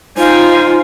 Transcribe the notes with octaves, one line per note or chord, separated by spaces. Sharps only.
D#4 F4 C5 G5 G#5